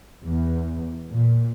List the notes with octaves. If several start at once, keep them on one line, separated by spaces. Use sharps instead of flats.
E2
A#2